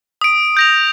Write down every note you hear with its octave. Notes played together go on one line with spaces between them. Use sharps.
D#6 D7
G6 A#6 F7